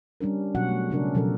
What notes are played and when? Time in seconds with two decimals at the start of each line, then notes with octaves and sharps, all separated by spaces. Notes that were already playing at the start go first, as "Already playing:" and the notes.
0.21 G3 C#4 D4 A#4
0.55 B2 F#3 C#4 F#4 F#5
0.68 A3
0.90 C#3 C#4 D4 A#4
1.15 B2 F3 F#3 A4 A#4